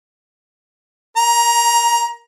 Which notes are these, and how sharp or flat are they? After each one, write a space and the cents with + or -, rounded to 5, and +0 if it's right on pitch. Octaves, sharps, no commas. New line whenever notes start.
A#4 +0 A#5 +20